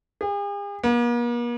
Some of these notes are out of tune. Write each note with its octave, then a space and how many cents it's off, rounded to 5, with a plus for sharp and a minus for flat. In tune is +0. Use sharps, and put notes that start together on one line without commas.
G#4 -45
A#3 +45